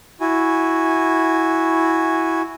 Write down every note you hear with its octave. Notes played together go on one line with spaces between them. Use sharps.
E4 F#4 G#5